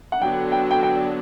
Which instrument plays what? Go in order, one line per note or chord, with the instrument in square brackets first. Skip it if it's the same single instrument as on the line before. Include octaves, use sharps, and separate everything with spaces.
[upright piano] F#5
[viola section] D3 F#3 B3 D4 [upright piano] G5
[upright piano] G5
G5
G5